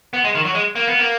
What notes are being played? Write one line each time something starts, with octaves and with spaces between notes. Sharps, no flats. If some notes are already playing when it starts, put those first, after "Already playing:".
B3
G#3
D#3
F#3
G#3
A#3
B3
A#3